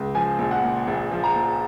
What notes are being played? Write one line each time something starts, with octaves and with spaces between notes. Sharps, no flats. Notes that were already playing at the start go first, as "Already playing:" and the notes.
Already playing: C#2
F3 G#5
A#1
F#5
A#2
A#1
F3
A#5
A#1